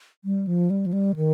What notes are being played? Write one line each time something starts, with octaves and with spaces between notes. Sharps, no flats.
G3
F3
G3
F3
G3
D#3